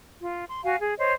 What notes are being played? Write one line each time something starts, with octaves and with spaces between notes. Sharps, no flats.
F4
C6
F#4 F5 G#5
G#4
C5 C#5 D#5